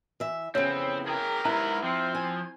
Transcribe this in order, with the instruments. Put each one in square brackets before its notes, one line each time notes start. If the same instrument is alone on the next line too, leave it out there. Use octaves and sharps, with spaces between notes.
[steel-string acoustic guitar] E3 E5
[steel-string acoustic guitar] F2 C#3 E3 [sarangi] B3 [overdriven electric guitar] C4 [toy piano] C#5
[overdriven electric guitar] G#4 G5 [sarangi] A#4
[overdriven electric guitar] G#2 B4 [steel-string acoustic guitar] E4 [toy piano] A#5
[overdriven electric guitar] F3 [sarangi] C4
[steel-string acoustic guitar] G#5